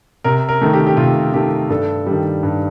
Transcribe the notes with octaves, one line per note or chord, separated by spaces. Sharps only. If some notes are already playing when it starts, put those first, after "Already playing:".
C3 A#4
A#4
D#3 A3
G4
G4
C3 F4
D#3 A3 G4
G2 A4
D#3 G3
G2